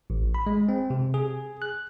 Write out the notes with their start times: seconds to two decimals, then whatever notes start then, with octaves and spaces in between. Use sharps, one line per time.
0.10 A1
0.34 B5
0.46 G#3
0.69 C4
0.90 C3
1.14 G#4
1.62 F#6